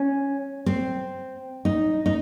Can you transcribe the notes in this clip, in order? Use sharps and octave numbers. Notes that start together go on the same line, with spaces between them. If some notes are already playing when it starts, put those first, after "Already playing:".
Already playing: C#4
C4
D#4
D#4